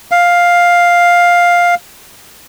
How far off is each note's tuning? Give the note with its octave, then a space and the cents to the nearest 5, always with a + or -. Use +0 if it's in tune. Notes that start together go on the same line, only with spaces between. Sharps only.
F5 +5